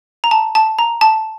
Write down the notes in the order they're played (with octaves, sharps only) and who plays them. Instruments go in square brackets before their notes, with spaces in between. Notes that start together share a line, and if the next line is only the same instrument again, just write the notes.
[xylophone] A#5
A5
A5
A#5
A5